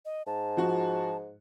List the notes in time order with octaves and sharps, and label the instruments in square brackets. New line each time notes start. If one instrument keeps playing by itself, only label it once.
[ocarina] D#5
[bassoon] G#2 [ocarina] A5
[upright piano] F3 F#4